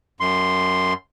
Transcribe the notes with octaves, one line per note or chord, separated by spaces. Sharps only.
F#2 C6